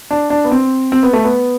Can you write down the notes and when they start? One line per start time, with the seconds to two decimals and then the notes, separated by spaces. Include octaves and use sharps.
0.11 D4
0.30 D4
0.44 B3
0.51 C4
0.92 C4
1.03 B3
1.13 A3
1.24 B3